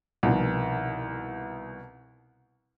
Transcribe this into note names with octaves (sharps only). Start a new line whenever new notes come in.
C2 B2 D#3 F3